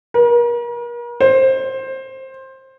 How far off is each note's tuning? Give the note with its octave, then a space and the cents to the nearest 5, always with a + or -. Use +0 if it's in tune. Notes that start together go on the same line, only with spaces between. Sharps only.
A#4 +40
C5 +15